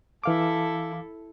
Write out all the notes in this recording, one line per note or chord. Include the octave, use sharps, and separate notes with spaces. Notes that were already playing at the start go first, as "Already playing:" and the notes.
E3 E4 A4 F5 D6